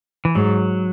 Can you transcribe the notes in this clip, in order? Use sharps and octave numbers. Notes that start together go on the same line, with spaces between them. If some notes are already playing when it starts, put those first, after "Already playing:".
E3
G#2 F#3